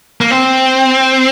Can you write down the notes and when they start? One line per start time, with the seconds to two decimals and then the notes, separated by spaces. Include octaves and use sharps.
0.21 A#3
0.31 C4